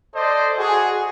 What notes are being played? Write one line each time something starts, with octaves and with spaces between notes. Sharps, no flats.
A4 C5 D5 D#5
F#4 G#4